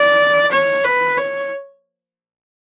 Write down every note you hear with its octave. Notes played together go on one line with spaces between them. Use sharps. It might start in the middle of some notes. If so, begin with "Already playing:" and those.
Already playing: D5
C#5
B4
C#5